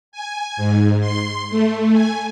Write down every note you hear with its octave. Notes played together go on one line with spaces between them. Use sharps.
G#5
G#2
C6
A3
G#5